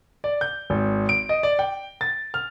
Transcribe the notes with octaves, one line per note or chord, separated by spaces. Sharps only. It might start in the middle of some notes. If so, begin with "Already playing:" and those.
D5
G6
G#1
D7
D#5
D5
G5
A6
F6